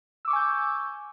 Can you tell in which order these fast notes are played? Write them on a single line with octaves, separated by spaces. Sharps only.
E6 D6 C#6 G#5 G6